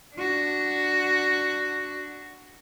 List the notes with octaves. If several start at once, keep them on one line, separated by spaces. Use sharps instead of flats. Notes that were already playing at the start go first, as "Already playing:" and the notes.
D4 F#4